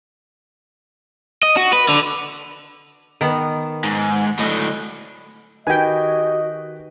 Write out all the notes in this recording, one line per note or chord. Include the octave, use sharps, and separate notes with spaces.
D#5
F#4
B4
D3
D#3 B3
G#2
A2 D3 D#5
D#3 F#4 G4 B4 D#5 G5 G#5